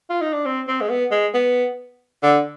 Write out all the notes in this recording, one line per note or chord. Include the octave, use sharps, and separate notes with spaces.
F4
D#4
D4
C4
C4
G#3
B3
G#3
B3
D3